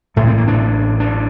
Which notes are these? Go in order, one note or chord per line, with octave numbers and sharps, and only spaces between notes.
A1 A2 A3
C4
A#3
D4
D4